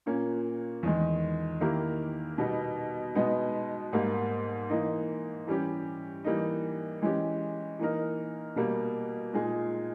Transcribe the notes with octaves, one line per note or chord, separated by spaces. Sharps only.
A#2 A#3 C#4
E2 D#3 G#3
D#3 A#3 E4 G4 A#4
B2 G3 B3 D#4
B2 G#3 B3 D#4
G#2 G3 A#3
E3 A#3 D#4
E3 G3 C#4 G4
E3 G3 A#3 D#4
E3 G#3 C#4 G4
E3 A#3 D#4 A#4
B2 G3 A#3
A#2 G#3 D#4 G#4